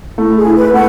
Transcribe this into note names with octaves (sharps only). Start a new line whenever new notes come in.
A3 E4
G#4
E4
B4
A3 F#5